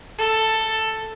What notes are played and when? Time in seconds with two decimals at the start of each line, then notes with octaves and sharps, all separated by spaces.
0.19 A4